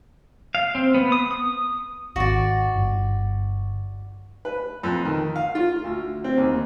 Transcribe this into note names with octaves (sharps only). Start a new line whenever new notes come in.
F5
C4
B3
D#6
D#6
G#1 F#4 D5
G1
B4
F2
D#3
F5
F4
D2
C4
D#2